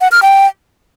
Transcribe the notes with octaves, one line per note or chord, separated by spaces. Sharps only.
F#5
F6
G5